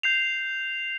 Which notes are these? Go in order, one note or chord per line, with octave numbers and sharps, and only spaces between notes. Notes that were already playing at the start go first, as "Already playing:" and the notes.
G6 C7 F7